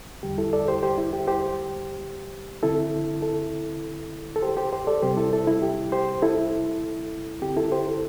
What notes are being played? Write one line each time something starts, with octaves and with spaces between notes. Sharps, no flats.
E2 D3 G3 G4
E4 A4
A4 D5
G4 C5
G4 C5
E4
G4
G4 C5
D3 C4 E4 A4
E4 A4
A4
G4 C5
G4 C5
G4 C5
A4 D5
C3 G3 C4 G4 C5
E4 A4
E4 A4
E4
G4
G4 C5
E4 A4
D3 C4 G4
E4 A4
G4 C5
E4 A4